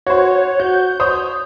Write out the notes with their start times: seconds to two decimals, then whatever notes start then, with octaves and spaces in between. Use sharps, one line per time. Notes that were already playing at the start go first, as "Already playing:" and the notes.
0.06 F#4 C5 C#5
0.60 F#4 G6
1.00 C5 C#5 D#6